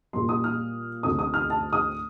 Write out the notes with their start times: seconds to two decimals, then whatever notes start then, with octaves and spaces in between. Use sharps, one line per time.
0.13 A#2 G3 A#3 C6
0.29 D#6
0.44 F6
1.03 D2 D3 A3 C4 D#6
1.19 D#6
1.34 F6
1.50 A5
1.73 D#6